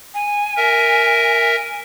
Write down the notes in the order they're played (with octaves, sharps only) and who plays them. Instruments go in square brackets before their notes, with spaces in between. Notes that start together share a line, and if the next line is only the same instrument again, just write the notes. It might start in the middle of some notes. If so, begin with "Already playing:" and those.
[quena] G#5
[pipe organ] A#4 E5